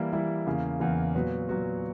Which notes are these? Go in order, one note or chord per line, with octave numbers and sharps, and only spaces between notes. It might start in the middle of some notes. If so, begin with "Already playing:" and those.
Already playing: E3 G3 A#3 E4
E3 G3 A#3 E4
E2 C#3 E3 A#3
E2 C#3 E3 A#3
A#2 F#3 B3 F#4 B4
A#2 F#3 B3 F#4 B4